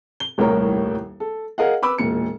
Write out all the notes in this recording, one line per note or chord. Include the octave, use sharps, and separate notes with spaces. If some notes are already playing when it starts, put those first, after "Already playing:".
G7
D#1 C2 A2 A#4 C#5 A#5
A4
G#4 A#4 D#5 F5 F#5
B4 B5 D6 E6
E1 A#2 C#7